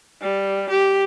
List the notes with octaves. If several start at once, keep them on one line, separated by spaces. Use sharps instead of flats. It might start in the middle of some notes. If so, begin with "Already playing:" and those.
G3
G4